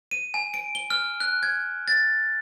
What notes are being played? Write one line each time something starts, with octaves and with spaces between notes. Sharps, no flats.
D#7
G#5
D7
G7
F6
F#6
G#6
A6